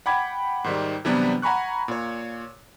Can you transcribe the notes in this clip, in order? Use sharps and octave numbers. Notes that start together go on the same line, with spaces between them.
F#5 G5 B5 D6 G#6
G#2 D#3 G3
C3 E3 F#3 G3 B3 D4
F#5 G#5 A#5 B5 C#6 F#6
A#2 C#5